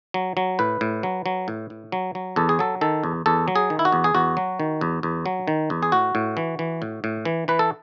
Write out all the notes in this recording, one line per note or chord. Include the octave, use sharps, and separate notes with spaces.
F#3
F#3
A2 B4
A2
F#3
F#3
A2
A2
F#3
F#3
E2 A4
G#4
F#3 A4
D#3 A4
E2
E2 A4
F#3
G#4
D#3
E4
F#4
E2
G#4
E2 F#4
F#3
D#3
E2
E2
F#3
D#3
E2
G#4
A2 F#4
A2
E3
E3
A2
A2
E3
E3 B4
A4